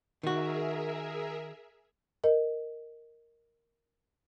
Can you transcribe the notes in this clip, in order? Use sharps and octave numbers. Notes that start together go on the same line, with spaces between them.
D#3 F#4 G#4 A#4 E5
A#4 D#5